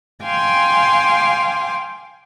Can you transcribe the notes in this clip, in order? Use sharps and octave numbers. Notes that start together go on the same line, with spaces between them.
F5 G5 G#5 C6 D6